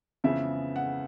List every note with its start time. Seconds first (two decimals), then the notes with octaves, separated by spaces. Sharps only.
0.24 F2 C#3 E3 G#3 B3 E5
0.76 F#5